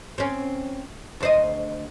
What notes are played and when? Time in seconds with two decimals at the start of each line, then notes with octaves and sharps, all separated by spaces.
0.18 C4 C#4
1.20 D2 C5 D#5